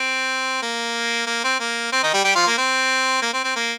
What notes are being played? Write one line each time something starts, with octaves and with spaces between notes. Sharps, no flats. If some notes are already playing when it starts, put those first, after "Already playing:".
Already playing: C4
A#3
A#3
C4
A#3
C4
D#3 D#4
G3 G4
G3 G4
F3 F4
A#3
C4
A#3
C4
C4
A#3